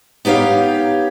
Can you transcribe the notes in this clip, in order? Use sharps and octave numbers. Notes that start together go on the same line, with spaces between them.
B3 D#4 G4 C#5 F5